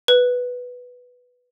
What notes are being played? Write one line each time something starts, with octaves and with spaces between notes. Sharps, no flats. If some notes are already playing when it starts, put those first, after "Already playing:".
B4